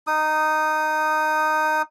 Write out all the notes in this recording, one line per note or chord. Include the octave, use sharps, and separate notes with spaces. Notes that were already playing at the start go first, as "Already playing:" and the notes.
D#4 D#6